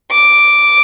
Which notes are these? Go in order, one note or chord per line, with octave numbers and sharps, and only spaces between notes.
D6